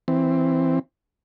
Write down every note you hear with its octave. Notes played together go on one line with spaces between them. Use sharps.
E3 C4